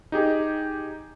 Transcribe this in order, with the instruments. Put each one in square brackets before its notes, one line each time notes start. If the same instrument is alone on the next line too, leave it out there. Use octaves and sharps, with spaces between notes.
[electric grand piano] D#4 G4 G#4